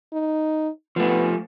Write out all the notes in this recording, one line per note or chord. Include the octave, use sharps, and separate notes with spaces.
D#4
F3 A3 B3